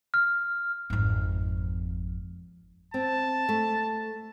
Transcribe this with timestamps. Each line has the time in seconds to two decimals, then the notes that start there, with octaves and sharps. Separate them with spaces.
0.14 F6
0.90 G#1 F2
2.94 C4 A5
3.49 A3